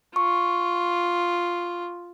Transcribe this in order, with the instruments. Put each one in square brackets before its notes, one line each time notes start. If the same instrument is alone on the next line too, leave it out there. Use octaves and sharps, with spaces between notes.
[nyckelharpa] F4 [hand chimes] C#6